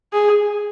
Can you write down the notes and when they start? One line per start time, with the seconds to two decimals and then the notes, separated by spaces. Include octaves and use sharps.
0.13 G#4